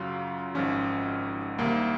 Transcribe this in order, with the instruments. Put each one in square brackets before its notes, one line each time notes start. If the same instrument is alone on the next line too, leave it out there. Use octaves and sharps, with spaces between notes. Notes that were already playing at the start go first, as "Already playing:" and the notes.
Already playing: [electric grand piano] F#2 C#3 F#3 F4
G#1 G#2 F3 C#4
C2 C3 D#3 A#3